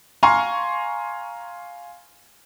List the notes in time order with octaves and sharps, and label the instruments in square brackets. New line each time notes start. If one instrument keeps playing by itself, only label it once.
[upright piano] F5 G#5 A#5 C6 C#6